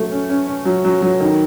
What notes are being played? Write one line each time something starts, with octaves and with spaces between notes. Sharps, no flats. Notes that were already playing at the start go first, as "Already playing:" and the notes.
Already playing: F#3 A3
C#4
C#4
C#4
F#3
F#3
F#3
D#3